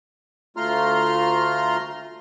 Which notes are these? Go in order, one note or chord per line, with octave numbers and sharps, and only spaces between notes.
D2 A3 F4 A#5 C6 F6